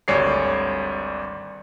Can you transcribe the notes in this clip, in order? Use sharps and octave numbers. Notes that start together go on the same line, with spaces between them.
G#1 D2 G3 C#5 D5 C7